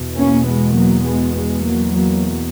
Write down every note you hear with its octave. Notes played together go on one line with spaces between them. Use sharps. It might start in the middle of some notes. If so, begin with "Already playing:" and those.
Already playing: E2 B2
A#3 C#4
G#3 B3
F#3 A#3
G#3 B3
G#3 B3
F#3 A#3
F#3 A#3